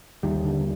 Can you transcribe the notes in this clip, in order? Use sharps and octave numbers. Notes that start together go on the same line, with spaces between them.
D#2 D#3 G3
D3